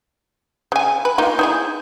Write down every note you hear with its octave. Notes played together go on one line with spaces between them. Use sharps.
C#3 G#5
B4
A#3 D#4 F4
D#4 E4 G#4